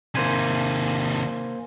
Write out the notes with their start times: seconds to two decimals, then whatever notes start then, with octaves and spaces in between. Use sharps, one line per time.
0.15 C3 D#3 A#3 C5 G#5